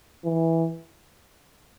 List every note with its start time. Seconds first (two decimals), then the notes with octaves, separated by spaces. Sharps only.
0.25 E3